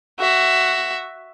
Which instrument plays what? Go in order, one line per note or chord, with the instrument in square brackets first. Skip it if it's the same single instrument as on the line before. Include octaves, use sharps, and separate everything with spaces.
[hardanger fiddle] F#4 E5